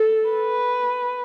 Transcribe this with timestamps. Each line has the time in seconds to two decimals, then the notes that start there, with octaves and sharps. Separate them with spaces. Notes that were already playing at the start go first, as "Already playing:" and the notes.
Already playing: A4
0.29 B4